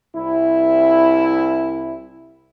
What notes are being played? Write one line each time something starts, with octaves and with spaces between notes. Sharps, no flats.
C2 E4